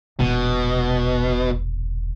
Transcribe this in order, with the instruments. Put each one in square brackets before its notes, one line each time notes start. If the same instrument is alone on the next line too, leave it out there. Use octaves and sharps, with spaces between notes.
[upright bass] E1 A#1 [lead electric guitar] B2